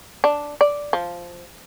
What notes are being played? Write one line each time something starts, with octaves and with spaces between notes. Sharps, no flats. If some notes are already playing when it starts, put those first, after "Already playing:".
D4
D5
F3